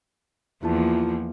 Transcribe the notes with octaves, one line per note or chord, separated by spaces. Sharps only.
E2 F3 A#3 E4 F4 A5